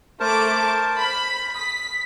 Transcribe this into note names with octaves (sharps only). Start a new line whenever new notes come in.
A3 A#4 C5 A5 D6
B5
D#6 B6